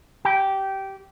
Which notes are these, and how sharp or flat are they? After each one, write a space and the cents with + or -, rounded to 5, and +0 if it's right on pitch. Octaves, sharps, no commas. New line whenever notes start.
G4 -15